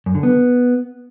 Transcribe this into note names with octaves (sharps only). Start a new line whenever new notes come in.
F#2
D3
B3